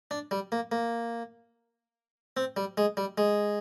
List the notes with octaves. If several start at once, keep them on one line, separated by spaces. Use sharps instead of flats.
D4
G3
A#3
A#3
C4
G3
G#3
G3
G#3